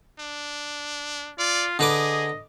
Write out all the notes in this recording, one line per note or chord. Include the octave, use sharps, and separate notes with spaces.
D4
F4 D5
D3 G#4 B4 D#5 D6